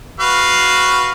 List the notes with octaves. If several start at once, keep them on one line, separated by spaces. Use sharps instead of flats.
F#4 B4 F5